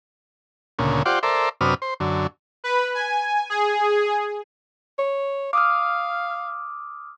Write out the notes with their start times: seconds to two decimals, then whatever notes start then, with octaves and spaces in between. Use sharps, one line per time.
0.79 D2 A#2 C#3
1.06 F4 G4 C5 D5 F#5
1.23 A4 A#4 C5 D5 E5
1.61 F#2 C3 D4 B4 D#6 F6
1.82 C5
2.00 F#2 D3
2.64 B4
2.95 G#5
3.50 G#4
4.99 C#5
5.53 F5 D6 D#6 F6